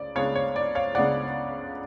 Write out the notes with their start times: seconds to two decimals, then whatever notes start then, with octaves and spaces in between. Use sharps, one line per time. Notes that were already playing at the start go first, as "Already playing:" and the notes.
Already playing: C#2 C#3 D5
0.15 C#2 C#3 G#3 B3 D4 C#5 F5
0.35 C#5
0.56 D5
0.75 C#5 F5
0.95 C#2 C#3 G#3 B3 D4 D5 F#5